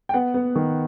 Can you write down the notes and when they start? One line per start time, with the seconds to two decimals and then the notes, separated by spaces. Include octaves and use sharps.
0.09 G5
0.14 B3 F#5
0.34 B3
0.56 D#3